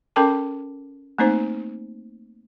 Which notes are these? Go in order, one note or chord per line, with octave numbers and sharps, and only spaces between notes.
C#4 A4 A#4 G5 A5 D6
A3 A#3 C4 D#4 C5